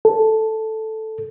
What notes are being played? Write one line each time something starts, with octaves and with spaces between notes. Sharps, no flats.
A4